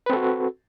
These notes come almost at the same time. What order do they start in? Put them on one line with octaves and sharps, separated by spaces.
B4 C4 A4 F#4